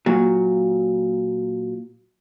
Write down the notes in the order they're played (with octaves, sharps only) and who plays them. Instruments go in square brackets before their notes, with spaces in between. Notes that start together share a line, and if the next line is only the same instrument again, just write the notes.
[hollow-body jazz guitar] A#2 F#3